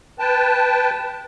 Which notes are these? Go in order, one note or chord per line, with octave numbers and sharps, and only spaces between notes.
B4 G5 A5